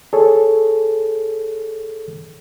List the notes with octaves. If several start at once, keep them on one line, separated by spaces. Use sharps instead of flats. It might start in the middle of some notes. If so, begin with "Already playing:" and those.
G#4 A4 C#5